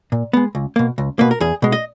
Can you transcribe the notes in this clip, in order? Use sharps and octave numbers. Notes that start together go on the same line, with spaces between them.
A#2
G#3 B3
C#2
B2 A#3
C#2
B2 A#3 B4
A#4
E2 G#4
B2 G#3
D#5